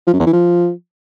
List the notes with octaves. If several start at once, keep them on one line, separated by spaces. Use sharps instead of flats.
F3
F#2
E2
E3
F3